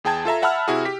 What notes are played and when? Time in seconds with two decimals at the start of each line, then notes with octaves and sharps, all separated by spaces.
0.04 E2 G#4 G5 A5 G#6
0.25 F4 A4 E5 A#5
0.42 E5 F#5 A5 B5 E6 F6
0.68 C3 E4 F#4 G#4
0.85 G4 B6